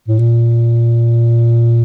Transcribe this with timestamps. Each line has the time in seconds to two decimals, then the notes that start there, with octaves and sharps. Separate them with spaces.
0.08 A2
0.19 A#2